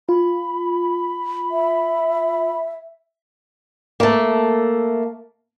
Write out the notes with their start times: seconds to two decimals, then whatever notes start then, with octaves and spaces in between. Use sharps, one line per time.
0.09 F4 B5
1.51 E5
4.00 A3 A#3